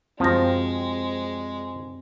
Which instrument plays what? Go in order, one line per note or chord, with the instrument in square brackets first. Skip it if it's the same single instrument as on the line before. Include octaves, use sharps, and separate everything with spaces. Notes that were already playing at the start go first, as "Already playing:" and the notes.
[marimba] F#2 A#6 [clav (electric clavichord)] F3 [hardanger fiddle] G#3 [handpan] C4